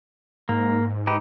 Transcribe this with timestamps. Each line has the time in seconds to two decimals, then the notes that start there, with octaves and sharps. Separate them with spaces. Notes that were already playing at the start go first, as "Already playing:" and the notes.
0.49 G#2 A#3
1.07 D#4 G4 B4